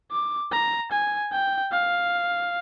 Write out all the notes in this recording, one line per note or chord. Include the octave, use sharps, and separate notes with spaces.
D6
A#5
G#5
G5
F5